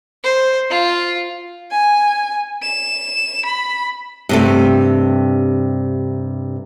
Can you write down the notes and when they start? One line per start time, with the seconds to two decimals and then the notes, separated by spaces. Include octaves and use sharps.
0.24 C5
0.70 F4
1.71 G#5
2.62 E7
3.46 B5
4.29 G2 C3 A3